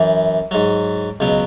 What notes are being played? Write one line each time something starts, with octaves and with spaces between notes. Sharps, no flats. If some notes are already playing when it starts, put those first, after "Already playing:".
Already playing: F#2 E3
G#2 F#3
C#2 B2 F#3